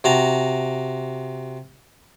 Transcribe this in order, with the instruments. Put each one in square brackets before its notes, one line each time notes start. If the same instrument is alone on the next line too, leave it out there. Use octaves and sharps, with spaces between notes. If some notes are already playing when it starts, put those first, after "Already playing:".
[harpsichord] C3 F#4 A5 A#5